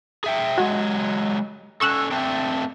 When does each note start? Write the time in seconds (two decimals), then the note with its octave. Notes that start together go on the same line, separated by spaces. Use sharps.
0.24 G#4 E5 G5
0.58 F#3 G#3 F#4
1.81 C#4 A4 C#6 E6 F#6
2.11 A3 C4 D4